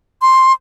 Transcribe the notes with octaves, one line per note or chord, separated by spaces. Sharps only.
C6